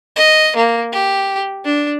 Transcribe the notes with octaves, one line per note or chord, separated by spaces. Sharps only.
D#5
A#3
G4
D4